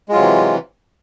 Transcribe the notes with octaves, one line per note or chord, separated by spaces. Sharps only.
C3 E3 F#3 G#3 F4